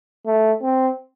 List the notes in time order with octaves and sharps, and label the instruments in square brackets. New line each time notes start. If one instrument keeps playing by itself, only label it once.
[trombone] A3
C4